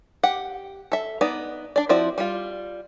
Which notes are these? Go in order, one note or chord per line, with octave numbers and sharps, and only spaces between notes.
G4 F#5
A4 E5
B3 D#4 D5
D4 D5
F3 C4 E4 F#4 D5
G3 F4